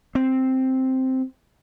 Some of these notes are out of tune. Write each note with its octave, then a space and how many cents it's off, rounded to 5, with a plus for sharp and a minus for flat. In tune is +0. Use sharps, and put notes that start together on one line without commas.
C4 +0